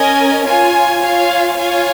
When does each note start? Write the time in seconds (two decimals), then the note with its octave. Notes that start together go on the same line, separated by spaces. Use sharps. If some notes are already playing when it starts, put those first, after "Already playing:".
Already playing: C#4 A#4 D#5 G#5
0.46 F4 C#5 G#5
1.03 F4 C#5 F5 G#5
1.60 F4 C#5 F5 G#5